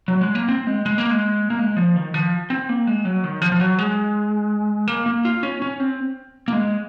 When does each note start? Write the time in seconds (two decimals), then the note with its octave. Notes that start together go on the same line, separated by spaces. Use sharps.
0.08 F#3
0.21 G#3
0.35 A#3
0.48 C4
0.67 G#3
0.86 G#3
0.98 A#3
1.11 G#3
1.50 A#3
1.59 G#3
1.77 F3
1.96 D#3
2.14 F3
2.50 C4
2.69 A#3
2.87 G#3
3.05 F#3
3.24 D#3
3.42 F3
3.52 F3
3.60 F#3
3.79 G#3
4.88 A#3
5.06 A#3
5.25 F4
5.43 C#4
5.62 C#4
5.80 C4
6.48 A#3
6.53 G#3